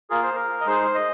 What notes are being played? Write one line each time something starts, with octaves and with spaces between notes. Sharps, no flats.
A#3 F4 G#4 A#4
C5
A#4
D#5
G#3 D#4 G#4 C5
D#5